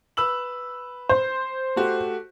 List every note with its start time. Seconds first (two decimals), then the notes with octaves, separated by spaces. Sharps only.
0.17 B4 E6 F#7
1.09 C5
1.76 A3 F#4 G4